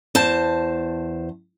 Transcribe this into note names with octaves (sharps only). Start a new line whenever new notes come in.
E2 C5 A5